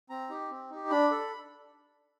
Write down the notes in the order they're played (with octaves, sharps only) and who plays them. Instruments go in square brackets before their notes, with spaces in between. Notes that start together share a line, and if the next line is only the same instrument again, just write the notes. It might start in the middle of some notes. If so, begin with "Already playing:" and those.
[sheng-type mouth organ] C4 A#5
D#4 G4
C4
D#4 G4
D4 B5
A4